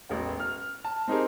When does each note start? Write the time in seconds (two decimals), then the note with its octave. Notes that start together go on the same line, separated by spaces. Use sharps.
0.09 E1 A1
0.40 F6
0.85 A5
1.08 C4 D#4 G4 G#4 A#4